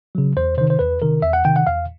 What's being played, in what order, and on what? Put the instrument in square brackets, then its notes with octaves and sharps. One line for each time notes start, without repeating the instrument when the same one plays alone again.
[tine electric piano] C#3 F#3
E2 C5
C3 C5
D#3
C5
E2 B4
C3 D#3 A#4
E2 E5
F#5
C3 D#3 G5
F#5
E2 F5